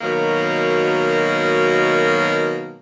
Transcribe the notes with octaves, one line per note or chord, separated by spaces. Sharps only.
B2 D#3 F#3 A#3